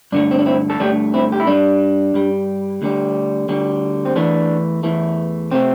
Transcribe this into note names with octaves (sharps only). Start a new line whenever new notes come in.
G2 D3 A3 D4
C4
D4
C4 E4
A4
G2 D3 A3 D4 G4
C4 E4
G4
E4
G2 G3 D4
G2 G3
D2 D3 G3
D2 D3 G3
C4
E2 E3 A3 D4
E2 E3 A3
C3 A3 C4